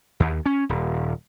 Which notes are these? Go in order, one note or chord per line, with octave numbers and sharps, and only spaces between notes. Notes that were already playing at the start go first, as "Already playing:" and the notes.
D#2
C#4
D#1